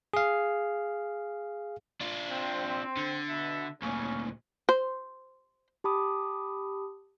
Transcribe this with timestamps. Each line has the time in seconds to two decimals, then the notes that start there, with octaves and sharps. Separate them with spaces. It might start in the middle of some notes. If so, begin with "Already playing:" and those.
0.14 G#4 F5
2.01 D4 F4
2.30 C4
2.97 D3
3.29 B2 E5
3.82 D2 A#2 C#3 C#4
4.69 C5
5.84 G4 A5 B5 D6 D#6